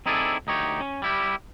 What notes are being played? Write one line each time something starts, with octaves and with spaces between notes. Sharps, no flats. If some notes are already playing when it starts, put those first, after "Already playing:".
C4 D#4 E4 G#4 A4 D5
D2 D#4 G4 C#5
C#4
G3 E4 G4